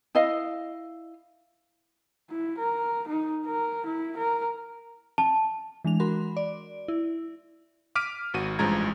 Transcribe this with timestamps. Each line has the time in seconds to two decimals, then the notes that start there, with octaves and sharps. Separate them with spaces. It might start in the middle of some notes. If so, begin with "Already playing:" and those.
0.15 E4 D#5 F5
2.30 E4
2.59 A#4
3.08 D#4
3.46 A#4
3.86 E4
4.17 A#4
5.18 A5
5.85 E3 G#3 D4 F7
6.00 F#4 A#4 B5 C6
6.37 D5
6.88 E4
7.95 D6 F6 B6 D7 D#7
8.34 G#1 F#4 D#7
8.59 A1 G2 F3 G#3 A#5 G#6